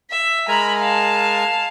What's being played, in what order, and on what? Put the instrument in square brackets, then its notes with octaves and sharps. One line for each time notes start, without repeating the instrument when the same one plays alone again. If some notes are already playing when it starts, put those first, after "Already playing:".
[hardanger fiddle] E5
[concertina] G#3 A#4 G#5 [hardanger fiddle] A#5 B5
[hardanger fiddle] F5 A5